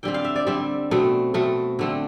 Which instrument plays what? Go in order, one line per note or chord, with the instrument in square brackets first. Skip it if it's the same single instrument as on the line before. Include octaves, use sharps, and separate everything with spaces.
[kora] D3 G3 C4 G5
F5
E5
D5
D3 G3 C4 E5
B2 A3 C4
B2 A3 C4
D3 A3 C4